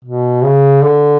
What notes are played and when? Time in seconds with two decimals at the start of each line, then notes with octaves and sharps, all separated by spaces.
0.04 B2
0.43 C#3
0.83 D3